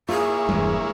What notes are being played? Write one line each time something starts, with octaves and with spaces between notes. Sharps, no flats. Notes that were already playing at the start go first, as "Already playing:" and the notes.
A#3 E4 F4 G#4 C#5
E1 G2 E3 G#3